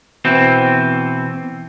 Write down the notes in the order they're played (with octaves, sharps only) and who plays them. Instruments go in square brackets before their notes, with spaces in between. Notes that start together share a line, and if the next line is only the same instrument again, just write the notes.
[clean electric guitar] B2 E3 C4